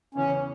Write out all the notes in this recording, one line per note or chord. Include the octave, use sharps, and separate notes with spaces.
E2 C#3 E3 C#4